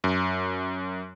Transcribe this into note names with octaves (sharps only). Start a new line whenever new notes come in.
F#2